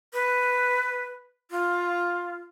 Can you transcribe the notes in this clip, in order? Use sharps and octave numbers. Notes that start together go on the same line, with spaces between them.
B4
F4